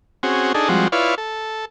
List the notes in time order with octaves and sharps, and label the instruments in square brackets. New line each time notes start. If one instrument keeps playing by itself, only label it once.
[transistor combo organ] C4 C#4 F#4 G#4
D4 D#4 G#4 A4
F3 G3 G#3 C4 F#4
E4 F4 B4 C#5 D5 F5
A4